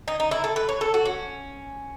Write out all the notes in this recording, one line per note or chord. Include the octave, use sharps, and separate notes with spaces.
D#4
D#4
E4
A4
B4
C#5
A4
F#4
C#4